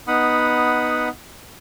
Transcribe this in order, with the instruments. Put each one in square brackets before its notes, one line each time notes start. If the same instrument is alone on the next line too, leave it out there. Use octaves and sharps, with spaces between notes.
[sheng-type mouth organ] B3 D#4 F#5 B5 D#6